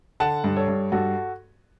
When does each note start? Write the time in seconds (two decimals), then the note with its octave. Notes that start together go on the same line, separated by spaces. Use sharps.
0.20 D3 F#5 A5
0.44 G2
0.56 A4 C#5
0.68 G2
0.92 G2 F#4 A4